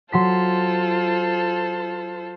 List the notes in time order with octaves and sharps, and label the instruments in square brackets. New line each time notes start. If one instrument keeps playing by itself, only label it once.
[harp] F#3 C6 B6 [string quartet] F4 A4 C5